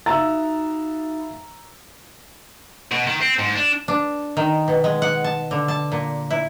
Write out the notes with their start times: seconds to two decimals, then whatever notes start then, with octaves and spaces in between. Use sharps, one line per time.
0.06 D#4 F#4 E5 F5 A#5 B5 E6 A6
2.92 B2
3.07 D#3
3.21 C4
3.39 G#2
3.55 D4
3.88 D4
4.37 D#3
4.68 B2
4.84 G#3
5.02 F#5
5.24 A5
5.51 D3
5.68 A5
5.92 A#2
6.30 E4